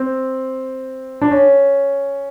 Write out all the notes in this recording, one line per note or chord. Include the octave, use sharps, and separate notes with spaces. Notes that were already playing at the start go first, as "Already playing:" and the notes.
Already playing: C4
D4
C#4